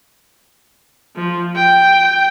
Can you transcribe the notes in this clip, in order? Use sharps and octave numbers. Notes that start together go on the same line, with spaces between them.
F3
G5